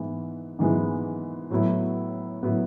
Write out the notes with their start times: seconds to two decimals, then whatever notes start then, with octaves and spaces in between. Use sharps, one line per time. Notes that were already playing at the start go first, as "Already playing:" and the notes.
Already playing: G#2 E3 G#3 B3 E4
0.59 G#2 E3 G#3 B3 E4
1.50 A2 F#3 B3 E4
2.42 A2 F#3 B3 E4